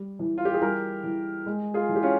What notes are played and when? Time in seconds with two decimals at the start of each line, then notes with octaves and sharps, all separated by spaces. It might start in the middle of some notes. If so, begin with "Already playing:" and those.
Already playing: G3
0.19 E3
0.38 F4
0.45 G4
0.54 G#4
0.62 G3 G4 A#4
1.04 E3
1.46 G#3
1.74 F4 G#4
1.89 E3
1.96 G4
2.03 C#4 F4